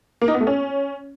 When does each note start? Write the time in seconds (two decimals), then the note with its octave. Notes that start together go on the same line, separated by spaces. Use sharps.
0.21 A#3
0.28 D#4
0.34 B3
0.41 A3
0.47 C#4